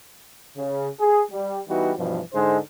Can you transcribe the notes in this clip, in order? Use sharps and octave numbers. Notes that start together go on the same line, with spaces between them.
C#3
G#4
G3
E3 G3 B3 D#4 F#4
G2 B2 E3 F3
G#2 D3 G#3 D#4 C5